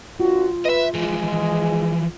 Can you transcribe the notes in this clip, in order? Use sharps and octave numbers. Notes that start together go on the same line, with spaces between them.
D#2 D4 F4 F#4
B4 D#5 E5
E3 F3 G#3